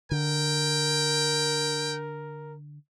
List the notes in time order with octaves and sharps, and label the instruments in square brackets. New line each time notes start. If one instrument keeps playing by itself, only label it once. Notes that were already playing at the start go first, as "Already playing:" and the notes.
[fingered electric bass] D3 [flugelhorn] A#4 [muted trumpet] G5